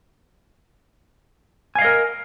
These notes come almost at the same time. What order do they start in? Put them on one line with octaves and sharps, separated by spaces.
G#5 F5 D#5 A#4